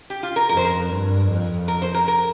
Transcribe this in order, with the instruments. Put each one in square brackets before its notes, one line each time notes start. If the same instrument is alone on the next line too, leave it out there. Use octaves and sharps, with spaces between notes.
[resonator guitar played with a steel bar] G4
F4
A#4
[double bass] F2 [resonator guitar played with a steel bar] A#4
[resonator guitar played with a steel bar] C5
A#4
[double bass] G2
F2
[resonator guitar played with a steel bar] A#4
C5
A#4
A#4